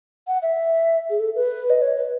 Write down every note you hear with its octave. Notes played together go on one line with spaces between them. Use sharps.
F#5
E5
G#4
A4
B4
D#5
C#5
B4